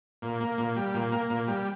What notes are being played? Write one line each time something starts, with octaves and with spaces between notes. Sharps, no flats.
A#2
A#3
A#2
G3
A#2
A#3
A#2
G3